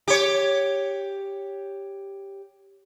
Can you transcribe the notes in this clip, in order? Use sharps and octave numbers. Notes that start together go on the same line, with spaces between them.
G4 C#5